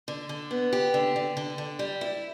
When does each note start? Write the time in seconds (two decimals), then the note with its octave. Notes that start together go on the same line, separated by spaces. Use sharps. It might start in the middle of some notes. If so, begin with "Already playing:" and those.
0.08 D3
0.29 D3
0.51 B3
0.73 G4
0.94 D3
1.16 D3
1.37 D3
1.58 D3
1.79 G3
2.01 E4